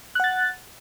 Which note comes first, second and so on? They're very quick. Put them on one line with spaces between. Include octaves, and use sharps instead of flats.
F#6 F#5 A6